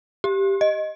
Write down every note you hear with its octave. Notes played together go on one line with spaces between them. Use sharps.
G4
D#5